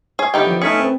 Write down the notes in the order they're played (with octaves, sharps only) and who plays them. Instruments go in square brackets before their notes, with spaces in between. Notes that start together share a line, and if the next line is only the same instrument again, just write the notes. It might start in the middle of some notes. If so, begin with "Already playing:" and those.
[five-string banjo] G#4 [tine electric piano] C#5
[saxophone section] D3 E4 G4 [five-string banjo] B3 D#4 G5
[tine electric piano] F3
[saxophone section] A3 B3 C#4 [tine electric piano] D#4 B6 C#7 [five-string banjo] G#4
[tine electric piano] C4 B4